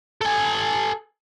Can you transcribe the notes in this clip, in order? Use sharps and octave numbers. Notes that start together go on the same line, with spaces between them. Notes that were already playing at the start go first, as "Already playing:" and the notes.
A4 G#5